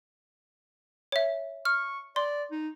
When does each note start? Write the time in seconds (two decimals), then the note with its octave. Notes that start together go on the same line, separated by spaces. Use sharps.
1.12 C#5 E5
1.65 C#6 F6
2.16 D5 C6
2.51 D#4